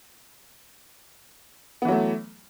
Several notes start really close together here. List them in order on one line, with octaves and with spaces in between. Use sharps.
B3 E3 F#3 A3